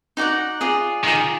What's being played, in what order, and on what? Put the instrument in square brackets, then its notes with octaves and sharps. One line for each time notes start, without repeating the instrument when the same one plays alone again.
[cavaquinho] D#4 F#4 D5 F#5
F4 G#4 D5
[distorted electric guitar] D#3 [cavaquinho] F4 G#4 D5